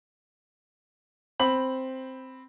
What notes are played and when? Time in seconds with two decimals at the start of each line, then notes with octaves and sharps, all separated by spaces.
1.40 C4 B5 F#7